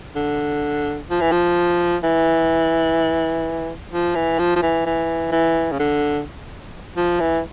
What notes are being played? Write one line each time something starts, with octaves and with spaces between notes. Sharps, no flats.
D3
F3
E3
F3
E3
F3
E3
F3
F3
E3
E3
E3
C#3
D3
F3
E3